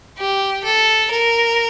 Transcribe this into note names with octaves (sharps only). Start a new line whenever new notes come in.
G4
A4
A#4